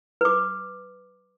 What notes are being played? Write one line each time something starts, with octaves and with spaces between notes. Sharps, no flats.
B4 D6